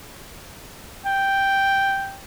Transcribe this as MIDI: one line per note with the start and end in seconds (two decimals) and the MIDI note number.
1.06 2.18 79